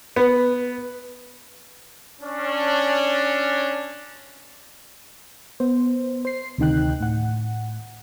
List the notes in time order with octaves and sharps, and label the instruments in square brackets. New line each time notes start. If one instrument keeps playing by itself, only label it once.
[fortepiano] B3
[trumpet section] C#4 D4
[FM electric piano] B3 C5
C5 C7
D2 C3 D#3 D#4 G5 F#6
A2 F#5